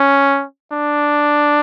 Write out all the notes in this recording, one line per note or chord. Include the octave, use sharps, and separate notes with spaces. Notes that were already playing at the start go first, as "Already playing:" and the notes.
Already playing: C#4
D4